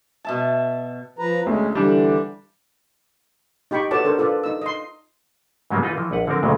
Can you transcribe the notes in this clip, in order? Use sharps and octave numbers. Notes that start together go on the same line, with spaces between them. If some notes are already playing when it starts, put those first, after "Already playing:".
B2 E5 A5
F3 B4 A#5
D2 G#3 C#4
D3 E3 G3 D4
D#4 G4 G5 B5 C#6
F#4 A4 B4 C#5 D5 A5
D4 A4 A#4 C5
F4 A4 B4 D5
D#4 E6
D#5 C6
G#2 C#3 F#3 G3 A#3 B3
E3 D#4 F4 B4 D#5
E3 F3
A#1 B4 F#5
D3 F3 F#3 C4 A#4
D2 A#2 C#3 F#3 A3